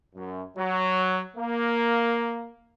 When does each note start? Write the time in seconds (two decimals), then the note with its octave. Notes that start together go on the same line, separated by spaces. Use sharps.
0.15 F#2
0.57 F#3
1.36 A#3